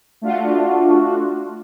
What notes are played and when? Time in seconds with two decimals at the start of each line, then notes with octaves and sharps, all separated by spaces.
0.22 A3 D4 F4 F#4